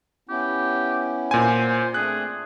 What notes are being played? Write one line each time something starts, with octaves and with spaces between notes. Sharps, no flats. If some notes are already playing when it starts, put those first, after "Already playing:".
B3 C#4 E4 G4
A#2 C5 G#5
A3 C4 D4 G#4 F#6